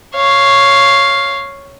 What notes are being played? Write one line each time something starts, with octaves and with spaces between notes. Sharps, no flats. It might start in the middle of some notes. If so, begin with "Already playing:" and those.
C#5 F5